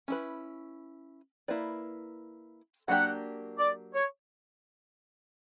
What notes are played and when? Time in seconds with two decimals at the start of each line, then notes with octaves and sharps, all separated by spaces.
0.08 C#4 E4 B4
1.48 A#3 E4 B4 D5
2.88 F#3 A#3 D4 G4 F#5
3.58 D5
3.94 C#5